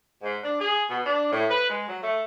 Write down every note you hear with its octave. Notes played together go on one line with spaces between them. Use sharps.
G#2
D4
G#4
B2
D4
A2
B4
G#3
F#3
A3